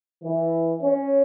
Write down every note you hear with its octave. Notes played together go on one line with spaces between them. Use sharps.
E3
C#4